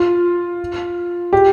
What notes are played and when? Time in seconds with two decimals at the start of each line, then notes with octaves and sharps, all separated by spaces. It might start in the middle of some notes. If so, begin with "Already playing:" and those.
Already playing: F4
1.33 G4